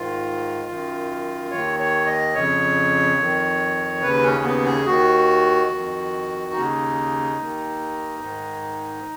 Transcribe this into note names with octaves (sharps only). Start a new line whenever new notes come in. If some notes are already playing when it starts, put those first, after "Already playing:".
Already playing: G#2 D#3 F4
F#2 D#3
D#2 D#3 C#5
C#5
D#5
F2 C#3 C#5
F2 D#3
D#2 C#3 B4
C#4
B3
G#4
D#2 D#3 F#4
F2 D#3
D#2 C#3 D#4
D#2 D#3
G#2 D#3